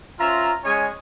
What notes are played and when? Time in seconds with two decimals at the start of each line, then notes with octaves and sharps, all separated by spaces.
0.19 C#4 F4 C5 E5 A#5
0.64 G#3 C#4 G#4 C#5 D#5 G#5